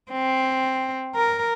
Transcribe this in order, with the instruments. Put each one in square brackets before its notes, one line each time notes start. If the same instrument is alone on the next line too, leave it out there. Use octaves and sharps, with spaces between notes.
[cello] C4
A#4